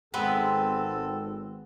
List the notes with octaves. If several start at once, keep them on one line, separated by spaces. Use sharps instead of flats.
G#1 G#3 B3 C4 A4 B4